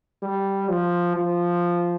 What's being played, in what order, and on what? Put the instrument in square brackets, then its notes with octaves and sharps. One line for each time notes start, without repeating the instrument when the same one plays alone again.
[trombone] G3
F3
F3